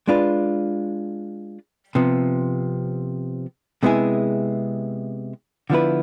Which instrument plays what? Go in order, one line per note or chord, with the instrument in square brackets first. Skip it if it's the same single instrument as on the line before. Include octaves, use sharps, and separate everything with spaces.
[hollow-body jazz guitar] G#3 D4 F4 B4
C3 F3 B3
C3 G#3 B3 E4 G#4
D3 F3 B3 E4 B4